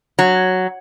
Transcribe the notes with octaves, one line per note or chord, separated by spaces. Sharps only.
F#3